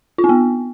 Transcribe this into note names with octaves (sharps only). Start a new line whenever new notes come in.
F4
C4
B3